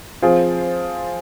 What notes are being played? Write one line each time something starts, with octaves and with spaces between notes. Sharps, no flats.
F3 C4 F4 G#4